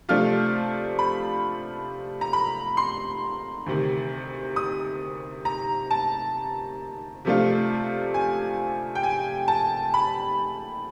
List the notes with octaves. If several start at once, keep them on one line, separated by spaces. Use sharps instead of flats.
C3 F3 A3 D4 F4 F6
B5
A#5
B5
C6
D2 C3 D#3
D#6
A#5
A5
C3 F3 A3 D4 F4
G#5
G5
G#5
A5
B5